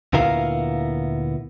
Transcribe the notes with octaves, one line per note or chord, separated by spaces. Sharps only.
D2 A#2 B3 E4 A#4 F5